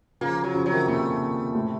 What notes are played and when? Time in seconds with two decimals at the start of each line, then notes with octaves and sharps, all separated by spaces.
0.21 C#3 F3 A#3
0.44 F#3
0.55 C#3 F3
0.66 F#3
0.72 C3 D#3
0.88 A#2 C#3 A3
1.55 A2 C3